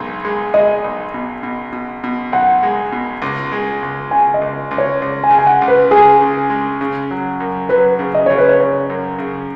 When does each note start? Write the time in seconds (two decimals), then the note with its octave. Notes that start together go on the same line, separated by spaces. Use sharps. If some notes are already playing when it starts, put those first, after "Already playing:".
Already playing: B1 G#3
0.25 G#3
0.54 G#3 D#5
0.84 B1
1.14 B2
1.43 B2
1.73 B2
2.04 B2
2.32 B1 F#5
2.63 G#3
2.92 B2
3.22 C#2
3.52 G#3
3.83 C#2
4.11 C#3 G#5
4.34 D#5
4.41 C#2
4.71 C#2
4.78 C#5
5.02 C#2
5.23 G#5
5.31 C#3
5.39 G#5
5.47 F#5
5.62 C#2
5.68 B4
5.91 C#2 G#4
6.21 C#3
6.50 G#3
6.81 C#3
7.11 F#3
7.40 F#2
7.69 F#3 B4
7.99 C#3
8.15 D#5
8.26 C#3 C#5
8.38 B4
8.49 C#5
8.60 C#3
8.90 F#2
9.18 C#3